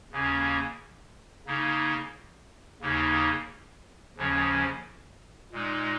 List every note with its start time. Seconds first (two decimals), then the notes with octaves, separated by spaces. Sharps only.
0.12 D#2 C#3 A#3 C#4
1.46 C#3 A#3 D#4
2.81 D#2 C#3 A#3 D#4
4.17 D#2 C#3 F3 C#4
5.52 A#2 G#3 D#4